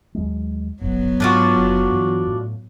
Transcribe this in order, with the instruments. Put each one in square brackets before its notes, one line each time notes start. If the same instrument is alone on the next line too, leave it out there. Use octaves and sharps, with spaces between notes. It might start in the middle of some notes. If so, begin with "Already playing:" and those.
[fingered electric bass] D#2 F#3 G#3
[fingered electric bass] D1 G#1 G2 [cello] F#3 B3
[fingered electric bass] G#2 [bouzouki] D4 F4 F#4
[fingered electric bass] F#1
G2 E3
A2